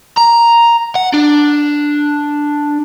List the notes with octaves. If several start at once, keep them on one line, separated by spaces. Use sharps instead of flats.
A#5
F#5
D4